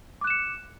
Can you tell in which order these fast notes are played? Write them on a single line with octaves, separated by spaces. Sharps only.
D6 F#6 E7 C#7